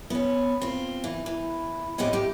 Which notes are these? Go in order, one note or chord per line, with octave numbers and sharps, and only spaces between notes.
B3 C#4
C4 F4
E3
E3
A2 B3 C4 G4 G#4 D#5
A2 G4